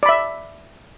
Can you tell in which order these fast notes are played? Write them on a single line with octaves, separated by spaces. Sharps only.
D5 B5 E5